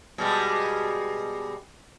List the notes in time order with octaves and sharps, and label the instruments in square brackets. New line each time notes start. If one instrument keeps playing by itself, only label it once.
[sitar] B2 G3 G#3